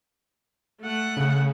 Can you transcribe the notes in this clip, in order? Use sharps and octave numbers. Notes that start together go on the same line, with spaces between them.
A3 F#5
C#3